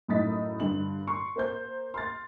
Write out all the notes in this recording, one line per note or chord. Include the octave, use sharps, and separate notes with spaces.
F#2 A2 D#4 D#6 A6 B6
G2 D3 F#7
C6 C#6
A#3 C5 G6
C6 F6 A6